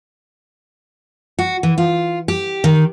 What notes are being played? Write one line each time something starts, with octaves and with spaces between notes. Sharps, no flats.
F#4
E3
F4
G4
D#3